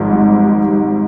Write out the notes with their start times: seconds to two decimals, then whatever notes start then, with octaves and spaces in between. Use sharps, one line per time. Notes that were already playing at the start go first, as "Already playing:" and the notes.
Already playing: G#1 G#2 F3
0.13 G3